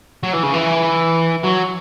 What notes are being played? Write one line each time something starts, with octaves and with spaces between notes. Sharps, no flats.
F#3
E3
C#3
E3
F#3